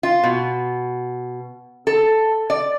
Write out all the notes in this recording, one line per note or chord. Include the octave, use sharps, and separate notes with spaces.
F4
B2
A4
D5